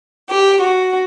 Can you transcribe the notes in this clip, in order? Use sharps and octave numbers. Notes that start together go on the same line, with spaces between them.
G4
F#4